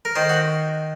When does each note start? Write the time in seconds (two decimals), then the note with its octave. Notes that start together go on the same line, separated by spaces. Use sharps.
0.05 A#4
0.16 D#3 C5
0.29 F#4